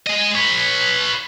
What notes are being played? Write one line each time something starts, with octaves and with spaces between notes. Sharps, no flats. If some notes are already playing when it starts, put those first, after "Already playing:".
G#3 D#5
B4 C#5